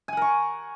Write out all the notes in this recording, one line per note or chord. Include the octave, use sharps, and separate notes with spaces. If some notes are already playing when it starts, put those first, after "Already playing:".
A#4 F#5 G#5 C#6